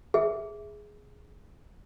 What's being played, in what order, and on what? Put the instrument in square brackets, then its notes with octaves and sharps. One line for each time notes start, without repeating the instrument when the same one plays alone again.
[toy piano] G#4 [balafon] E5